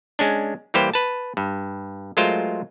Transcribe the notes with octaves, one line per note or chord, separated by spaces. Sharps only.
G#3 C#4 D4
E3 G3 A#3 G4 B4 C5
B4 A5
G2
F#3 G#3 A3 F4 A#4 C5